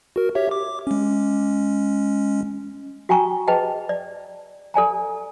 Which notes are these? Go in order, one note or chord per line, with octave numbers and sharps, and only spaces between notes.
F#4 A#4
G4 C#5 E5
D6
G#3 C#4
F#4 G5 G#5 A#5 C#6
G#4 B4 D#5 G5 A5
D5
A4 D5 G#5 A#5